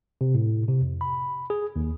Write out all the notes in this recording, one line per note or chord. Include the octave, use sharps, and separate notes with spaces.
C3
A2
C3
F2
B5
G#4
D#2